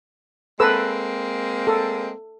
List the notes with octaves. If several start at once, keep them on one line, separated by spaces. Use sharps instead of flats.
G#3 A#3 C4 A4 B4 E6
A4